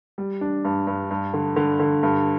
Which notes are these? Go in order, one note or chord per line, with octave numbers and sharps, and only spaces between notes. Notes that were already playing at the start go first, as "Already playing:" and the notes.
G3
D4
G2
G2
G2
D3
D3
D3
G2